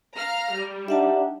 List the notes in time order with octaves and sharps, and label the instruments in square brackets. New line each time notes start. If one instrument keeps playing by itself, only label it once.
[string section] F5 A#5 F6
G3
[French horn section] D4 D#4 G4 [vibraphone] E5 F#5 A5